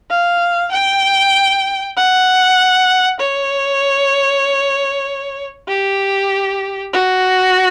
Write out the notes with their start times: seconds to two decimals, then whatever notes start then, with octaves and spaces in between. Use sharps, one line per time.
0.10 F5
0.72 G5
1.97 F#5
3.20 C#5
5.69 G4
6.94 F#4